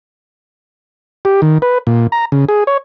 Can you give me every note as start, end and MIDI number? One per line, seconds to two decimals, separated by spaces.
1.25 1.41 67
1.42 1.58 51
1.62 1.78 71
1.87 2.07 46
2.12 2.25 82
2.32 2.45 49
2.49 2.64 68
2.67 2.77 73